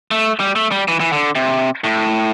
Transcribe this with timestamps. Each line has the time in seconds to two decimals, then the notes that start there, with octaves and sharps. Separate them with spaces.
0.11 A3
0.40 G3
0.56 A3
0.72 G3
0.88 E3
1.00 E3
1.12 D3
1.35 C3
1.84 A2